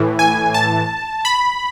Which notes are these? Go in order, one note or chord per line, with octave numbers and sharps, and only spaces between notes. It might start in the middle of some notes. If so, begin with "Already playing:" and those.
Already playing: A2 E3
G#5
A5
B5